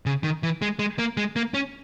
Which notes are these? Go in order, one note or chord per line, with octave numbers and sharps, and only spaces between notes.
C#3
D#3
E3
G#3
G#3
A#3
G#3
A#3
C#4